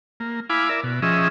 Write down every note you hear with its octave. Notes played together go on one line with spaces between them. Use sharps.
A#3
E4 F5 G#5 B5 D6
A#4 D5 E5
B2
F3 C#4 G#4 D#5 E5